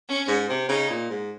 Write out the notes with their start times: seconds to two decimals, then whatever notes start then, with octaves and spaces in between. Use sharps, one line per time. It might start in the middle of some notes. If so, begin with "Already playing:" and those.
0.08 C#4
0.28 G#2
0.49 C3
0.69 C#3 D#4
0.90 A#2
1.10 G#2